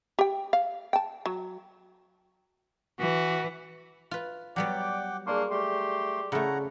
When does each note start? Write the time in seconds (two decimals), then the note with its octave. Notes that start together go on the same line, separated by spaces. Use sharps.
0.19 G4 G5
0.53 F5
0.93 G5 A5
1.26 F#3
2.99 E3 F#4
4.11 F4 B4
4.56 F#3 G3 B3 D5 F#5 G5 D6
5.27 A#3 D4 G#4 D5 C6 C#6
5.51 A3 G4 C6
6.32 C#3 A3 E4 F#5 A#5